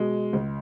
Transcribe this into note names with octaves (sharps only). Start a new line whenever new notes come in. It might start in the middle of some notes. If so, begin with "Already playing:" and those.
Already playing: B2 G#3
C#2